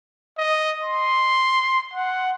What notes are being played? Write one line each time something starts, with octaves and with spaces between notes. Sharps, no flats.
D#5
C6
F#5